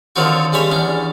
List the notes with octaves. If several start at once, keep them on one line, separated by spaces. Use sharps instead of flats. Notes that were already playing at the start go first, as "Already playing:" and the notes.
D3 D#3 F3 F#3 C4 F#4
C#3 G3 G#3 C#5 B5
E2 C#4 D4